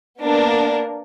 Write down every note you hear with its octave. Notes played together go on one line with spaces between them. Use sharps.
A#3 B3 D4 A#4